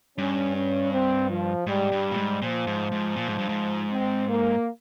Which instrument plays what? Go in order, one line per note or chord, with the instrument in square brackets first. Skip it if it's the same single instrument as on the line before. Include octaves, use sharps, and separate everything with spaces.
[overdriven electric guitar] G2 [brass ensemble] C#4
[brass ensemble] C#4
C4
F3
[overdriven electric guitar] G#2 [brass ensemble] G3
[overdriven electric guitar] G2
A#2
G#2
[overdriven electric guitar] A#2 [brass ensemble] F3
[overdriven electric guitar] G#2
G#2
A#2
G#2
G2
G#2
[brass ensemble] C4
A#3